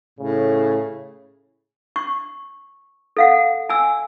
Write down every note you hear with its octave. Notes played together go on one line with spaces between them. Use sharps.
A2 C#3
C#6
A4 F5 F#5
G#5 E6